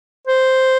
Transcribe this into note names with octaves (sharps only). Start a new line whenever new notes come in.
C5